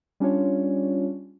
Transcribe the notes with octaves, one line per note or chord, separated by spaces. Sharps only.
G3 C#4 D4 F4 C#5